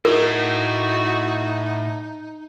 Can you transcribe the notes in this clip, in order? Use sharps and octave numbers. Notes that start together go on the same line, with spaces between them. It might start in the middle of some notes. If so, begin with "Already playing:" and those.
A2 D#4 F#4 A#4